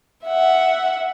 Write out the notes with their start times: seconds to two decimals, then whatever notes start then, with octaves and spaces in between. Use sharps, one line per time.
0.25 E5 F#5